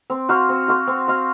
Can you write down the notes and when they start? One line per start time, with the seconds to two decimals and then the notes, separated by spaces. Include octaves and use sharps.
0.10 C4
0.29 F#4 C5 F5
0.49 C4
0.68 F#4 C5 F5
0.87 C4
1.08 F#4 C5 F5